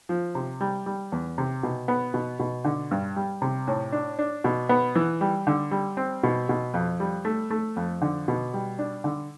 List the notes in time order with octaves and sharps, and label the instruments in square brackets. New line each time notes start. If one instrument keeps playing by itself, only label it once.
[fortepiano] F3
C3
G3
G3
E2
C3
B2
B3
B2
B2
D3
G2
G3
C3
A2
D4
D4
B2
B3
E3
G3
D3
G3
C4
B2
B2
F2
G3
A3
A3
F2
D3
B2
G3
D4
D3